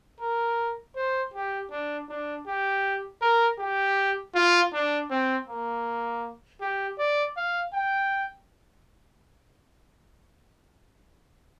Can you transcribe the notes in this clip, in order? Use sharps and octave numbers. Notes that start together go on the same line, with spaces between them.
A#4
C5
G4
D4
D4
G4
A#4
G4
F4
D4
C4
A#3
G4
D5
F5
G5